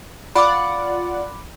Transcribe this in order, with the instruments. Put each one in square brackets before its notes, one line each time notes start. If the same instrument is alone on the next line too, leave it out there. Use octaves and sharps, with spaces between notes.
[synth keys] F4 D5 F#5 [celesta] B5 D6